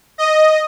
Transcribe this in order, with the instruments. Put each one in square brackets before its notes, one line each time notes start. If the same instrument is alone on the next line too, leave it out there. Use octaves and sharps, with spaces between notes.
[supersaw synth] D#5